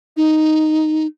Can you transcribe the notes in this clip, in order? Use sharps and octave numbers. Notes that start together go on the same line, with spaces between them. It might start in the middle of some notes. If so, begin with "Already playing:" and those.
D#4